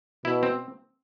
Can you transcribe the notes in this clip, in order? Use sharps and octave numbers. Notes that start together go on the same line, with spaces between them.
B2 E4
C4